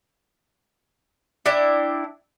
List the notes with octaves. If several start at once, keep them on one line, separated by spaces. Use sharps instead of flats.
D4 E4 E5 G5